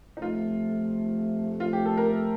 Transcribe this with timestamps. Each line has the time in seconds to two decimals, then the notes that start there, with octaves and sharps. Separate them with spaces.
0.17 D#4
0.21 F2 C3 F3 A3 F4
1.60 F4
1.73 G4
1.85 A4
1.98 A#4